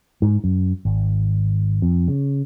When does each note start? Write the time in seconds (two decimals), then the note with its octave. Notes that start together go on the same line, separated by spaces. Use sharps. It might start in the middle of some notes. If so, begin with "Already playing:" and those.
0.22 G#2
0.44 F#2
0.85 G#1
1.82 F2
2.08 C#3